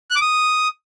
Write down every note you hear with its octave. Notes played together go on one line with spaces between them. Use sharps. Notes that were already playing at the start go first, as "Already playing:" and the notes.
F#6
D6
D#6